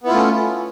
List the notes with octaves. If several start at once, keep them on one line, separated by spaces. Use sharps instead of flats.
A3 B3 C#4 E4 F4